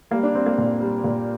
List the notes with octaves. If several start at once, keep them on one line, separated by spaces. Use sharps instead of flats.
G3 A#3
D4
G3 C4
A#3
A#2
G3
A#2